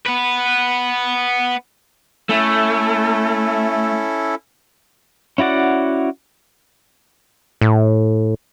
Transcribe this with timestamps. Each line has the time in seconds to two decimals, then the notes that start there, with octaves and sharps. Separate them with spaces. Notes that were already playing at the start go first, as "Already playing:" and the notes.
0.07 B3 B4
2.29 A3 C#4 E4 A4
5.38 C#4 E4 F#4 D5 F#5
7.61 A2